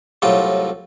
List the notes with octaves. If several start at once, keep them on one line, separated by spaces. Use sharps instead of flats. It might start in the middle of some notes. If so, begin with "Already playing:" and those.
C2 A2 F#3 F4 G5